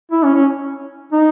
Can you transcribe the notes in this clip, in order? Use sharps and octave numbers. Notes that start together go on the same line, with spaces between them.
E4
C#4
C#4
D#4